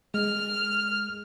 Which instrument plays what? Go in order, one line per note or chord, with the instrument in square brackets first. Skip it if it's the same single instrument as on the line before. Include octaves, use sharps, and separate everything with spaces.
[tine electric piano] G#3 [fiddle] F6